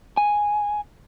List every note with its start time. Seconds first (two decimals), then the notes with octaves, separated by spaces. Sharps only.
0.17 G#5